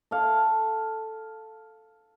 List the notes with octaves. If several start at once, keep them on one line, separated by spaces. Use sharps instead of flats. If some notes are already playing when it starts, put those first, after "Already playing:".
A4 F5